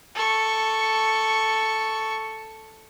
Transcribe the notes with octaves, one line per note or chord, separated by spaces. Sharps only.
A4 C#6